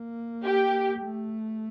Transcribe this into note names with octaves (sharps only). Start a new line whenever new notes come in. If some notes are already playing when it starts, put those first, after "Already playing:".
Already playing: A#3
G4
A3